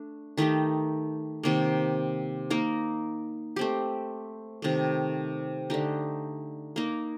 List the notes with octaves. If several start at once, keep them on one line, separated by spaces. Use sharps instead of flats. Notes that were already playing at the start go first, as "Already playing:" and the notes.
Already playing: A3 D4
D#3 A3 D#4 G4
C3 D#3 A#3
A#3 D#4 A#4
A3 C4 G4
C3 D#3 A3
D3 A3 D#4 G4
A#3 D#4 A#4